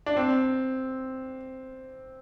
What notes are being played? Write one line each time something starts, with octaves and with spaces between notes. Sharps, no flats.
D4
C4